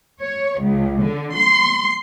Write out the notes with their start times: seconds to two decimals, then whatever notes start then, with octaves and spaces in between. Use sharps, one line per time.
0.21 C#5
0.61 C#2
1.01 D3
1.35 C6